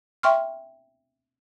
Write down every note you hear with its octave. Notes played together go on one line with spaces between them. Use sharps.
E5 G5 C6 C#6 F6